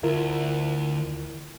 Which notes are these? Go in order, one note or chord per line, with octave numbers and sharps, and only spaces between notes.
D2 E4 F4 A#4